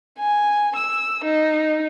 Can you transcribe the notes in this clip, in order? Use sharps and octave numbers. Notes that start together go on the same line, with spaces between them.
G#5
E6
D#4